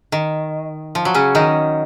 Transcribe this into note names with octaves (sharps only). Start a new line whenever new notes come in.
D#3
F3
F#3
C#3 C#4
D#3 D#4